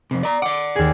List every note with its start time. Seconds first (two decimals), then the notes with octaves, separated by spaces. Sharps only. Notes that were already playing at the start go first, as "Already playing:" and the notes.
0.11 F2 C3
0.23 D5 A#5
0.42 D5 F#5 D6
0.76 D#2 G#4